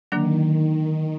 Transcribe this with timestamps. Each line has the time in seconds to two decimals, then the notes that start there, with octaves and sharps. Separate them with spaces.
0.12 D3 D#3 F#3 A#3 D4